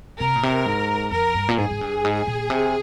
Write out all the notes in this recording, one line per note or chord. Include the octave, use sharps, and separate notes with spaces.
C3 A#4
A#2
C3
G#2
F2 A#4
G2
A#2
G#2 G#4
G#2
G2
G#2
A#2
C3